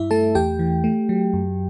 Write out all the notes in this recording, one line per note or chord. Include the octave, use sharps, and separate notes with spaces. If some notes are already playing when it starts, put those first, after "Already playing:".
Already playing: G2 E4 E5
A3 A4 A5
E2 G4 G5
E3
A3
F#3
F#2